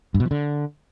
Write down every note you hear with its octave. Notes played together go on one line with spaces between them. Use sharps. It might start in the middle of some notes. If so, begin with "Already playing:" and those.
G2
B2
F3
D3